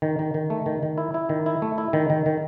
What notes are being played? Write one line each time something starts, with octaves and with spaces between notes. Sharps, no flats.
D#3
D#3
D#3
A3
D#3
D#3
E4
E4
D#3
E4
A3
E4
D#3
D#3
D#3